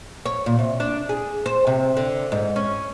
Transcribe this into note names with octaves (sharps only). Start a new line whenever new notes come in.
C#5
A#2
C3
D4
G#4
C5
C3
D3
G#2
C#4